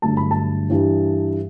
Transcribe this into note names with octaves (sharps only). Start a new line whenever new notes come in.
G1 G2 F#3 A3 A5
B5
A5
G2 E3 G3